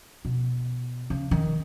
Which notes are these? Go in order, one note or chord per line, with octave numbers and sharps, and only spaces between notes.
B2
C#3
D#3